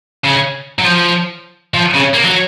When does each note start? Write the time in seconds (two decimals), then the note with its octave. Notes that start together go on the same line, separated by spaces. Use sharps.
0.24 C#3
0.79 F#3
0.85 F3
1.74 F3
1.95 C#3
2.14 A#3
2.25 F#3